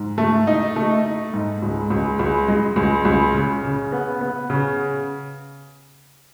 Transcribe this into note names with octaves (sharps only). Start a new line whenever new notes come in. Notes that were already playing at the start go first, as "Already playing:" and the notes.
Already playing: G#2
A3
D#4
A3
D#4
G#2
C#2
C#2
C#2
G#3
C#2
C#2
C#3
C#3
B3
B3
C#3